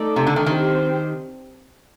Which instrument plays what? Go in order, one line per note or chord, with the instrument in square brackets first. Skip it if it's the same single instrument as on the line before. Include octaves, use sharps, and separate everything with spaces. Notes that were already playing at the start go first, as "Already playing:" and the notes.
Already playing: [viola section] A3 D#4 A4 D5
[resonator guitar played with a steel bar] C3
D3
D#3
[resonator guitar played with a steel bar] D#3 [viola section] C4 G4 C5